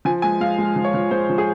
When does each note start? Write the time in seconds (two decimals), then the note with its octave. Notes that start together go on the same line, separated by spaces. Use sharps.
0.05 F3 G#5
0.22 G#3 G#5
0.41 G#3 F5
0.58 G#3
0.76 F3
0.85 C#5
0.94 F3
1.11 G#3 C5
1.30 F3
1.38 G#4